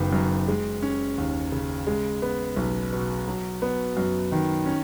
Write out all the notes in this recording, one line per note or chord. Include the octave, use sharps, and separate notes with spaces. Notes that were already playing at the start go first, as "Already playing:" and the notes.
Already playing: F#1 D#3 B3
F#2
G#3
C#4
D#2
C#3
G#3
B3
B1
B2
F#3
B3
F#2
D#3
C#4